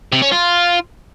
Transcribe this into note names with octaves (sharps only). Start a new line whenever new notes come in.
C3
C#4
F4